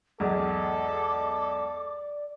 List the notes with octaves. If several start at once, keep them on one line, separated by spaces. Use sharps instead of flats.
B1 E2 G#2 A4 D5 D6